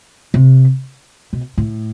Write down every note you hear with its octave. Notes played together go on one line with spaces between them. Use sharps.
C3
B2
A2